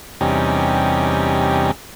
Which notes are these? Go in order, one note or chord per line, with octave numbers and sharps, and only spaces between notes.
E2 C3 G3 C#4 D#4